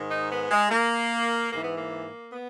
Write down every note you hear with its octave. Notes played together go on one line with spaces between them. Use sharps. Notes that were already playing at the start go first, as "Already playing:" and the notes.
Already playing: G#2 D#3
D#4
B3
G#3
A#3
G#2 E3 A#3
B3
A#3
B3